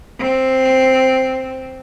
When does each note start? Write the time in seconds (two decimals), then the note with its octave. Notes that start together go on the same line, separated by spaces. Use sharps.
0.19 C4